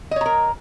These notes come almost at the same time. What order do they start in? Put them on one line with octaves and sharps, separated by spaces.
D#5 C#5 A#5 A#4